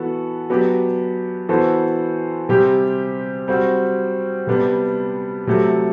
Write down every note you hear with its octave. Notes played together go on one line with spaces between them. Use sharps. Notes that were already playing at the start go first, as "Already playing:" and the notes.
Already playing: E3 B3 F#4 A4
F#3 B3 D4 G4
E3 B3 F#4 A4 C5
C3 G3 C4 G4
G3 C4 F#4
C3 G3 B3 D4
C3 F#3 A3